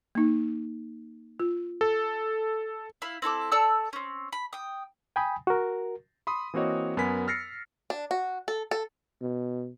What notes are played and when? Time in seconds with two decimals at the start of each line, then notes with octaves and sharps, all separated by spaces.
0.15 A#3 D#4
1.40 F4
1.81 A4
3.02 E4 F5 B5
3.22 C4 E4 A4 D6
3.52 A4 D5 A5 E6
3.93 C4 C#4
4.32 B5
4.53 G5 D#6
5.16 G5 G#5 B5 D#6
5.47 F#4 A#4
6.27 B5 C6 D#6
6.54 E3 A#3 C4 F#4 C#5 D#5
6.97 F#2 B3 A#4 G#5 B5 B6
7.27 E6 F6 A6 A#6 C7 C#7
7.90 D4
8.11 F#4
8.48 A4
8.71 A4
9.21 B2